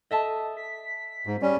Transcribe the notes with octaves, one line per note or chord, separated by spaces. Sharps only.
A4 D#5 E5 A5
B6
G#2
G3 C#4 D5